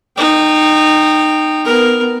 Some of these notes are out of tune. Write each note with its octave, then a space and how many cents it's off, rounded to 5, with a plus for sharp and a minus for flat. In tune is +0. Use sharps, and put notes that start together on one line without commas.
D#4 -20 G5 +0
B3 +0 A#4 +0